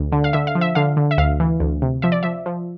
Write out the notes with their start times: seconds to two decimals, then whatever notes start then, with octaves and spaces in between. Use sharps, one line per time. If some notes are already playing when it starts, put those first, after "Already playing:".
Already playing: D2
0.12 D3
0.24 F5
0.33 D3 E5
0.47 F5
0.55 F3
0.61 E5
0.75 D3 F5
0.97 D3
1.11 E5
1.18 D2 F5
1.40 E3
1.60 D2
1.82 C3
2.02 F3 E5
2.12 D5
2.23 F3 E5
2.46 F3